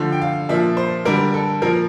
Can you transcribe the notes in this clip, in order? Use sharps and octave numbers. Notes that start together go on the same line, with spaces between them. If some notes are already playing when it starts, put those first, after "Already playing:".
Already playing: D3 F3 A3
G5
F5
A#2 F3 A#3 D4 E5
C5
D3 G3 D4 A#4
A4
A#2 F3 A#3 A#4